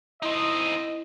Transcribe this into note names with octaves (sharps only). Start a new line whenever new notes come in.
C4 D#4 E4 D#5